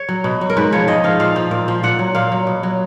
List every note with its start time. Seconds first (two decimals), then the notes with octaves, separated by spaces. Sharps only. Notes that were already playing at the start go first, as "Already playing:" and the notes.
Already playing: C#5
0.09 F#3
0.24 B2
0.41 F#3
0.50 A#4
0.57 G#2 B4
0.72 F3 C#5
0.88 G#2 D#5
1.04 F3 F5
1.20 A#2 F5
1.36 F3
1.51 A#2
1.68 F3
1.83 A#2 F#5
1.99 F#3
2.15 A#2 F5
2.32 F#3
2.47 B2
2.63 F#3